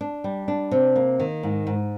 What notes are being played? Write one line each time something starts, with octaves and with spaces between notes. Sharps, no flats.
D4
G3
D4
C3
A#3
D#3
G#2
G#2